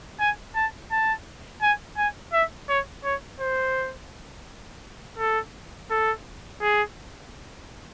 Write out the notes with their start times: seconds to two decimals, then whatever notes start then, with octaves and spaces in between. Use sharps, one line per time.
0.20 G#5
0.55 A5
0.91 A5
1.62 G#5
1.97 G#5
2.33 E5
2.69 C#5
3.04 C#5
3.40 C5
5.18 A4
5.90 A4
6.61 G#4